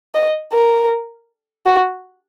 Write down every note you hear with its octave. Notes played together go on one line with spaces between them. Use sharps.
D#5
A#4
F#4